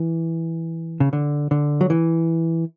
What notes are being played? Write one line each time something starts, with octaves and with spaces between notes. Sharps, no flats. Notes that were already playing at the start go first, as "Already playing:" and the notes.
Already playing: E3
C#3
D3
D3
F#3
E3